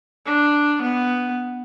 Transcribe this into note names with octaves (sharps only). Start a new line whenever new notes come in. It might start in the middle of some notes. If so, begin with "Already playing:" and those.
D4
B3